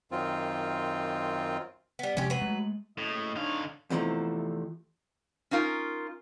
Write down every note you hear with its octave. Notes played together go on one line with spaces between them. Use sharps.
F#2 D#3 C4 F4
G3 B3
C3 F3 G#3 C#4 G4
F#3 B4
G#3 A3
F#1 A2 D#5
D3 D4 D#4 C#5 F5
E2 C3 E3 F3 A3 D#4
C#4 D#4 F4 A#4